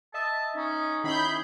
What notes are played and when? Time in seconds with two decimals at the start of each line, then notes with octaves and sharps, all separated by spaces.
0.14 D#5 E5 A5
0.56 C#4 D#4
1.04 D#3 C#4 E4 G#4 B5 G6